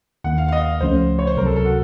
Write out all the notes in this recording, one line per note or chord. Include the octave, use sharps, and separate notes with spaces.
D#2 D#3 A#3 F#5
F5
F5
D#5
C#2 C#3 F3 A3 C#4 C5
C#5
C5
C#2 C3 F#3 A#4
A4
A4
F#4